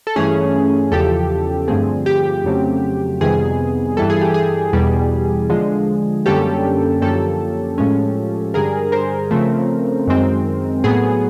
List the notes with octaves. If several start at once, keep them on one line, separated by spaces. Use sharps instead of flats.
A4
G2 E3 A3 C#4 G#4
E2 C#3 F3 G4 A4
G2 D3 F3 A3 C4 G#4
G4
F2 C#3 F#3 A3 C4
F2 C3 D#3 G3 B3 G#4
G2 E3 G3 A4
G#4
G4
G#4
E2 B2 G3
D3 F3 G#3
F#2 D3 G3 A#3 C#4 G4 A4
F#2 D3 F3 A#3 C#4 G4 A4
A2 F3 G#3 C#4
G2 D3 G3 G#4 A#4
A#4 C5
C#3 F3 A3 C4
F#2 D#3 G#3 C4
A2 F#3 B3 G#4